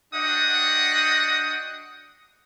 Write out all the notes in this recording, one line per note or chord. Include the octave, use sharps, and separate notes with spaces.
D4 F#4 D#5 F#5 G5 D#6